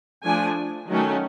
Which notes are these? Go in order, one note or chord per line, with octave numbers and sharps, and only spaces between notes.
F3 A3 D4 G#5
D#3 F#3 A3 C#4